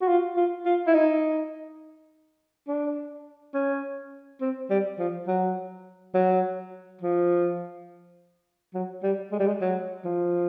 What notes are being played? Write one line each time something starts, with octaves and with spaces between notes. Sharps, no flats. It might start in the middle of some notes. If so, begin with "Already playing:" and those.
F#4
F4
F4
F4
E4
D#4
D4
C#4
C4
G3
F3
F#3
F#3
F3
F#3
G3
G#3
G3
G#3
F#3
F3